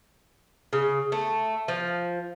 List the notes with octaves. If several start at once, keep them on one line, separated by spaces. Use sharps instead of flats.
C#3
A3
F3